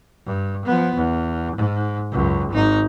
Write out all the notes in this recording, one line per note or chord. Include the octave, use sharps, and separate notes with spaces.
G2
F3 B3
E2
G#2
C#2 F#2
G#1 D#4